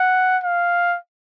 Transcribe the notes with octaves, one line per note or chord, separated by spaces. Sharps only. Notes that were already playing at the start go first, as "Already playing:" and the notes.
Already playing: F#5
F5